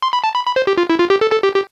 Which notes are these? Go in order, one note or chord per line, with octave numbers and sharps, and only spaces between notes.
C6
B5
A5
B5
B5
C5
G4
F4
E4
F4
G4
A4
A4
G4
G4